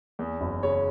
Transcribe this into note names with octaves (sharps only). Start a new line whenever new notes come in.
E2
F#1
C#3 C#5